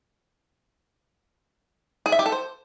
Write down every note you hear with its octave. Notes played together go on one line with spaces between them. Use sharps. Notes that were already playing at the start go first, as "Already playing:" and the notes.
G#4
E5
G4
A4
C5